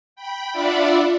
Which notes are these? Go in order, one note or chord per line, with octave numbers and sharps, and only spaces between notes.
G5 B5
D4 F4 D5 E5 F#5 B5